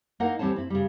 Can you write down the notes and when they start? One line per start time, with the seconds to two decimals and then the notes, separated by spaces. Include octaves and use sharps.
0.20 A#3 D#4 E4 A#4 D#5 F#5
0.39 D2 E3 G3 C4 C#5 A5
0.56 C4 E4
0.70 C#3 G3